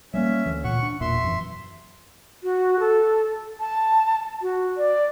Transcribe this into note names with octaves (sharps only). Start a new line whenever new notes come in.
G3 G#3 A#3 C#4 E5
D2 E3
A#2 F#5 C#6
D4
E1 A#2 E5 C6
F#2 E3
F#4
A4
A5
F#4
D5